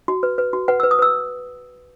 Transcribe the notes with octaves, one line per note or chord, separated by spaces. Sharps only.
F#4
B4
B4
F#4
B4 F#5
B4 E6
D#6
B4 E6